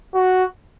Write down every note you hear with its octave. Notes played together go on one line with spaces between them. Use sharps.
F#4